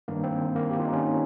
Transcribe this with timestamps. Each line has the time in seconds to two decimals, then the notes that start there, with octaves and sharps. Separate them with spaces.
0.08 G2 D#3 A#3
0.24 C4
0.56 A#3
0.71 G4
0.79 F4
0.85 D#4
0.93 C#4